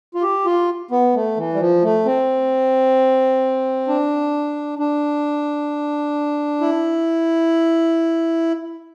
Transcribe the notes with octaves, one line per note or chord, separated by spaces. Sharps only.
F4
G4
F4
B3
A3
E3
G3
F3
A3
C4
D4
D4
E4